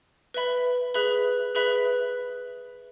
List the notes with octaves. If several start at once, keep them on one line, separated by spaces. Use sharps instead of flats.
B4 E5 B5
G#4 B4 E5 B5 F#6
G#4 B4 E5 B5 F#6